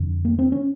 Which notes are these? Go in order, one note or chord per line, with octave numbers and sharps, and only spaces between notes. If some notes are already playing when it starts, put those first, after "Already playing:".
Already playing: F2 D3
A#3
C4
C#4